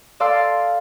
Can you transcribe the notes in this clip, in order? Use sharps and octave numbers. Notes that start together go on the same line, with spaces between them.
A4 D5 F5 C6 E6 F6